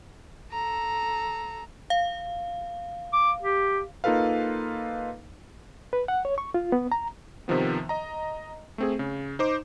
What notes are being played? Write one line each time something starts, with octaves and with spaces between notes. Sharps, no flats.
A4 A#5
F5
D6
G4
A#3 D#4 F4 A4 B4 F5
B4
F#5
C#5
C#6
F4
B3
A#5
C3 D#3 F3 B3
D#5 A#5
A3 C4 G#4
C#3
D#4 C5 D6